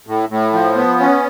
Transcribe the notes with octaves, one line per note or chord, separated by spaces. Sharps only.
A2
A2
F3
B3
C#4